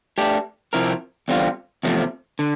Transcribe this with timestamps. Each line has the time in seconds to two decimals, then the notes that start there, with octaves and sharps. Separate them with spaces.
0.18 A3 D4 G4
0.73 C3 F3 C4 E4 A#4
1.28 E2 D3 G3 C4 F4
1.83 E2 C3 F3 A3
2.39 D3